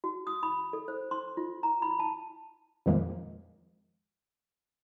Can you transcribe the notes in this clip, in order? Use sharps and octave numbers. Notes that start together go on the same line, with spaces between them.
F#4
D#6
B5
A4
C5
C6
F4
A#5
B5
A5
F2 A#2 D#3 F3 G#3 A#3